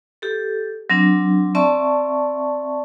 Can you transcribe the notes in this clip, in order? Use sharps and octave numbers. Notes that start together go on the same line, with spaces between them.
G4 A4
F#3 C4 D4
C4 D5 E5 A5 C#6